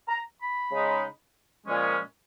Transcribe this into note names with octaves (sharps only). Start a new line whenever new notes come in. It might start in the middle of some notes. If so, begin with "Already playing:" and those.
A#5
B5
C#3 G#3 D#4
A#2 F3 G#3 C#4